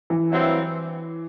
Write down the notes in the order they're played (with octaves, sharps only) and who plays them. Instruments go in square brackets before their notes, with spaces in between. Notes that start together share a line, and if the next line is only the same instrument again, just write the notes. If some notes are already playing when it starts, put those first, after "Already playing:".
[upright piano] E3
[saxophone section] G2 F#3 C4 E4